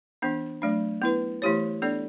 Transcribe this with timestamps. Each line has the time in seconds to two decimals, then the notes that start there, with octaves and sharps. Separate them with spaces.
0.22 E3 B3 D4
0.62 F#3 A3 D4
1.02 B3 E4 B4
1.42 E3 A3 E4 G4 C#5
1.82 B3 D4 A4 D5